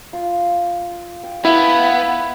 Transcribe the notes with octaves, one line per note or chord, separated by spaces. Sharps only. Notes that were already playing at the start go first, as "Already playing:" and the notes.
F4
G5
B3 E4 F5 G#5